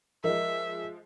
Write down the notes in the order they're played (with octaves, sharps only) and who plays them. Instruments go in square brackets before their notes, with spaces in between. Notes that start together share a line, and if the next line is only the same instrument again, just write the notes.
[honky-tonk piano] F3 G#3 [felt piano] A#4 D#5 [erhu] E5